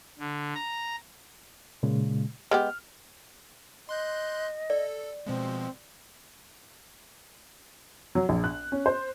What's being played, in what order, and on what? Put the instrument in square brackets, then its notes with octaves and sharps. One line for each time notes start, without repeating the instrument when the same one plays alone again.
[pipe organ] D3
A#5
[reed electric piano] A#2 C#3 G#3
[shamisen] G#3 B3 G4 [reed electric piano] F6
[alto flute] D#5 [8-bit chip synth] C6 F#6 G6
[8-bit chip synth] A4 [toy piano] D5
[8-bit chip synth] B2 F3 G#3 [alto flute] C4
[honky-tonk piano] F#3
A#1
F#6
C#4
C5